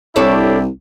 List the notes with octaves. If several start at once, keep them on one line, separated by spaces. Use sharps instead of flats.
C2 D4 E4 G4 A4 C#5 D5